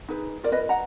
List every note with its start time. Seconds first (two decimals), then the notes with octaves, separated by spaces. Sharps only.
0.08 D#4 G#4 B4
0.43 F4 A#4 D5
0.52 B4 D#5
0.69 F#5 A#5